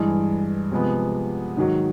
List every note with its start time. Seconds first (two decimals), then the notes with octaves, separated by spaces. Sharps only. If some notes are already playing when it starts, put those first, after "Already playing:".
Already playing: G2 E3 G#3
0.71 C3 F3 G#3 B3
1.57 G#2 D#3 F#3